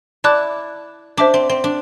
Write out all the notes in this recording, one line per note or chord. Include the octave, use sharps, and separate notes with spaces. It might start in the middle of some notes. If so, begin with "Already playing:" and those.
E4 D5 A5 D6 F#6
D4 C5 E5 A5 D6
C4
C4
D4